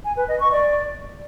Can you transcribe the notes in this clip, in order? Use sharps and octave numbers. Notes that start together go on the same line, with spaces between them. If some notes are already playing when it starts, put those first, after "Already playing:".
G#5
B4
D#5
C#6
D5